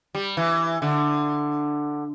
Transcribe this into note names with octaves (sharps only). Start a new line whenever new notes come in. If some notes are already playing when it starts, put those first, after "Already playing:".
G3
E3
D3